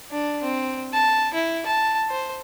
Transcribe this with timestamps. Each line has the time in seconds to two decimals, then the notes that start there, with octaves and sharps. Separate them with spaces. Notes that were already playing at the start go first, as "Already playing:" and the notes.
0.11 D4
0.43 C4
0.93 A5
1.34 E4
1.66 A5
2.10 C5